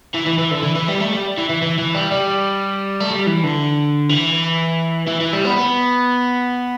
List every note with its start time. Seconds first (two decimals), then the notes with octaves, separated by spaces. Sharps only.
0.14 E3
0.26 E3
0.39 E3
0.51 D3
0.63 E3
0.76 E3
0.88 G3
1.00 A3
1.13 G3
1.37 E3
1.50 E3
1.62 E3
1.78 E3
1.95 G3
2.12 G3
3.00 A3
3.11 G3
3.27 E3
3.44 D3
4.09 E3
5.08 E3
5.21 E3
5.33 G3
5.45 B3
5.57 B3